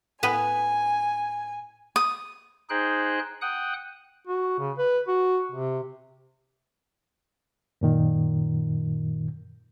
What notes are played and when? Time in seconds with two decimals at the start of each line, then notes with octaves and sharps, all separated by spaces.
0.23 A2 B3 B4 G#5
1.96 D#6
2.70 D#4 G#4 C5 G5 F#6
3.42 F#5 G5 D#6 F#6
4.27 F#4
4.59 C#3
4.78 B4
5.08 F#4
5.52 C3
7.81 F#2 A#2 D#3